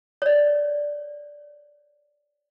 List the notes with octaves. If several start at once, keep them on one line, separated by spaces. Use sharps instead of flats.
C#5 D5